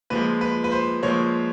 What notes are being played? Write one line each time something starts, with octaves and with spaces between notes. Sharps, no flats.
A#2 F3 G#3 B4
B4
B4
C5
A#2 F3 G#3 C#5